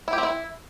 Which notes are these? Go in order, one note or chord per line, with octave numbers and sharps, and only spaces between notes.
E4
G4
C4
E4